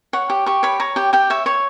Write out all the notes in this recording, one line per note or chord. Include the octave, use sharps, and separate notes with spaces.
C#5 F#5
G4
G4 C#6
C#5 B5
C#5 A#5
G4 G5
G4 G5
C#5 E5
C#5 C#6